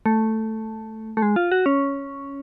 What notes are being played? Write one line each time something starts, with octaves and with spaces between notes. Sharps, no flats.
A3
A3
G#3
F4
F#4
C#4